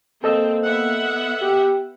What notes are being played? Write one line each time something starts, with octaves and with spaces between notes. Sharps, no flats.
A#3 C4 A4 D#5 E6
B3 E5 F#5
G4